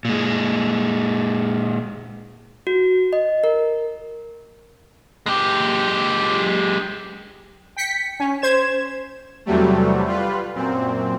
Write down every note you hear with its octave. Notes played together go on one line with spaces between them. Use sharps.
A#2 G#3
F#4
D#5
A#4
G#3 G4
G5 B6 C#7
C#4
C5 G#6 E7
E2 C3 F#3 G3 A3
G3 F4 B4
F#2 A#2 C4